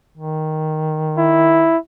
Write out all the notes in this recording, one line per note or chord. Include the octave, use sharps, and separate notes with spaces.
D#3
E4